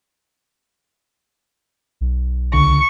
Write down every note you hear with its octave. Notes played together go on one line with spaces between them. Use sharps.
B1
C#2 D3 C#6